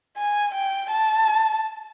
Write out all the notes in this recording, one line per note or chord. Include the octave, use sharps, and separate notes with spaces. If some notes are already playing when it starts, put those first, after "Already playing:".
G#5
G5
A5